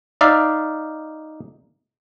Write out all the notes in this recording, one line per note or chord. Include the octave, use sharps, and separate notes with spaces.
D#4 D5 E5 F5